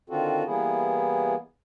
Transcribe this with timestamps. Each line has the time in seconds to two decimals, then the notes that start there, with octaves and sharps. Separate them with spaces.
0.10 D3 D#3 C4 F4 F#4 A4
0.47 E3 G3 A#3 B3 E4 G#4